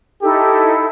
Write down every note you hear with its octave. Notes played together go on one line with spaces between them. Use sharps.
D#4 E4 G4 A4